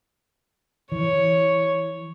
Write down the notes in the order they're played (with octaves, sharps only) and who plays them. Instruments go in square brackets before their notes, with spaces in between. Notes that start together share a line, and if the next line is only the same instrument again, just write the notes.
[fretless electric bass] E3 [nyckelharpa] C#5